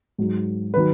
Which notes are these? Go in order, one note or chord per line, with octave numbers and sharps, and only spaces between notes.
G#2 F#3
D#3 F#3 B4